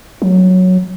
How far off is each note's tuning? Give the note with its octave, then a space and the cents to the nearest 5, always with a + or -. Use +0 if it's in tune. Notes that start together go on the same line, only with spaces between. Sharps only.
F#3 -5